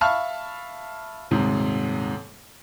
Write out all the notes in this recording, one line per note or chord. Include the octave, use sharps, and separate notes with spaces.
E5 F5 A5 B5 C#6 F6
D#1 G#2 C3